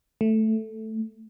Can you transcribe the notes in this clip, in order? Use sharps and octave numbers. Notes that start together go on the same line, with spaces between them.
A3